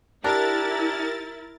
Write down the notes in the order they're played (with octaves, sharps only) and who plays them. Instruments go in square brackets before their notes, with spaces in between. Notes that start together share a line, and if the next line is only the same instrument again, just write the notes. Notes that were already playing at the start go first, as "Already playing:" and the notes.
[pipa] D4 [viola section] E4 [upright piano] G4 [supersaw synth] A#4 A6